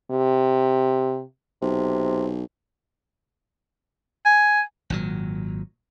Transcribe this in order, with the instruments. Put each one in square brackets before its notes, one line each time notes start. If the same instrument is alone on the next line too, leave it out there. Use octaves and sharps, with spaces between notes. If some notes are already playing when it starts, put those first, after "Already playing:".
[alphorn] C3
[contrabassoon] B1 [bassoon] C3
[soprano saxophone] G#5
[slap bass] G#1 A#2 F#3